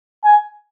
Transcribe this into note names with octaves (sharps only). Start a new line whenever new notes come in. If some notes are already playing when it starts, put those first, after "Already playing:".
G#5